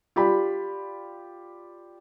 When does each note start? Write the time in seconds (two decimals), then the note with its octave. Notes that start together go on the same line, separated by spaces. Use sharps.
0.16 F4 G4 D5 B5